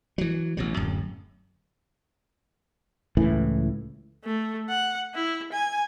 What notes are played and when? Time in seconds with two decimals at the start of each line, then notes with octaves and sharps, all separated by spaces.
0.18 E3 F#3
0.57 A1 B2 F#3
0.77 D1 F#2
3.17 C#2 A2 E3
4.24 A3
4.69 F#5
5.14 E4
5.52 G#5